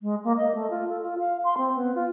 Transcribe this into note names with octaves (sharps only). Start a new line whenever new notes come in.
G#3
A#3
D#5
A3
F4
A4
F4
F5
C6
C4
B3
F4